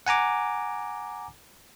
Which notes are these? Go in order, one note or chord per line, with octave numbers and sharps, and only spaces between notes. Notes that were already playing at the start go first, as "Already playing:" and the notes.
F#5 G#5 A#5 D6